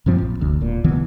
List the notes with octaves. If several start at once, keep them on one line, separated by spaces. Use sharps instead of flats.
F#2 A#2 F3 C4
A#1
F1 D2
E1 A#2
C2 D#3 E3 B3